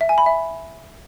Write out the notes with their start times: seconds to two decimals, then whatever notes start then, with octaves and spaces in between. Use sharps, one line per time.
0.01 E5
0.09 G#5
0.18 B5
0.26 E5